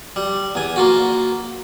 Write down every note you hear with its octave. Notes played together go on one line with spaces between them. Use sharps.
G3
E2 G#5
A#3 F4 F#4